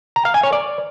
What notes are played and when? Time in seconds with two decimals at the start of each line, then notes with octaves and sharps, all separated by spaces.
0.16 A#5
0.25 F5
0.34 G#5
0.43 C#5
0.53 D5